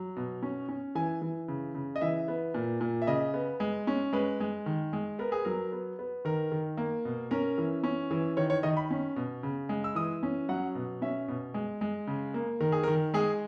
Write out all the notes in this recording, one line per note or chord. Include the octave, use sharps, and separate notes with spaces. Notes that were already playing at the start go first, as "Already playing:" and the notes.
Already playing: F#3
B2
C#4
C#4
E3 G#5
E3
C#3
C#3
D#5
E3 E5
B3
A#2
A#2
E5
C#3 D#5
B3
G#3
C#4
G#3 B4
G#3
D#3
G#3
B3 A#4
G#4
F#3 A#4
B3
B3
D#3 A#4
D#3
A#3
B2
C#4 A#4
E3
C#4
E3
D#3 C#5
C#5
D#3 D#5
B5
C#4
B2
C#3
G#3
E6
E3 D#6
C#4
F#3 F#5
B2
C#4 E5
B2
G#3
G#3
C#3
A#3
D#3 A#4
G#4
A#4
D#3
G#3 G#4